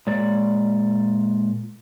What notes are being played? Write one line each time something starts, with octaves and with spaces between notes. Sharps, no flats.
A#2 G#3 C#5 D5